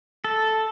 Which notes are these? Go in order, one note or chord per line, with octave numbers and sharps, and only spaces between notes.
A4